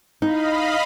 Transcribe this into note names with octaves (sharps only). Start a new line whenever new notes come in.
D#4 D#5 F5 B5